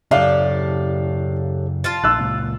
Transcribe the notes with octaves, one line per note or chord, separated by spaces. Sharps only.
F#2 A2 C#3 D4 G4 F5
F4 F5 A5
A#1 E6 F#6
C#2 A#2